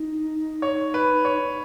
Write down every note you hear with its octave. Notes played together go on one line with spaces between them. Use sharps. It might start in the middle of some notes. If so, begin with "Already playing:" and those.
Already playing: D#4
C#5
B4
C#5